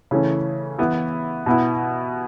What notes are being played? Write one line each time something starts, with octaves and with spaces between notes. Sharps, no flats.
C#3 E3 A3 C#4
E3 B3 E4
B2 B3 E4